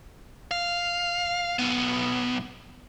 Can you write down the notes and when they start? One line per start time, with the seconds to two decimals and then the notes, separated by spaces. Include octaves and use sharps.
0.51 F5
1.59 B1 B3